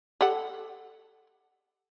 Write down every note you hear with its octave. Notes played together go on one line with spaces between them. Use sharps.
G4 A4 F#5